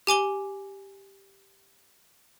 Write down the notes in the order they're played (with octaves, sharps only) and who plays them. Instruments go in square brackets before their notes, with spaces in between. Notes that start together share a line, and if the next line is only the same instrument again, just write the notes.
[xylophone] G4 G#5 D6 G7